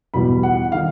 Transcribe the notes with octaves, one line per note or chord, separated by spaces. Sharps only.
E2 B2 G3 B5
F#5
D#3 F5